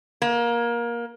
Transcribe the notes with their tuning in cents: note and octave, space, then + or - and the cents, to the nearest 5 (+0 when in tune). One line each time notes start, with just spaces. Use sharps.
A#3 +20